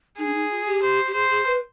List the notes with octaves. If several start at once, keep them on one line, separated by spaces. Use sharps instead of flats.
D#4 G#4
D4
D#4
F4
G4
C5
G4
G#4 C5
G#4
B4